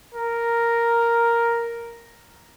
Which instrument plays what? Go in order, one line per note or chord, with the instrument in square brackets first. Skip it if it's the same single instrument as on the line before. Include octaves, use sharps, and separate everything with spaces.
[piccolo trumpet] A#4